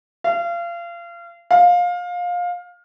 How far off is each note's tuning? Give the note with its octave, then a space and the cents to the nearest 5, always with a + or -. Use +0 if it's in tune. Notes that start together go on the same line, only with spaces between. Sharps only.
F5 -30
F5 +20